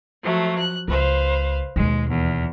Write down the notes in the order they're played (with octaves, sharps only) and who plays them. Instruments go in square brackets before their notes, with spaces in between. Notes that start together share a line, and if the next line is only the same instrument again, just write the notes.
[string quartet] F3 F#3 A3
F#6
[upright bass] C#2 [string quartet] B4 C5 F5
[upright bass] D#2 B2 [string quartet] G#3
[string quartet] E2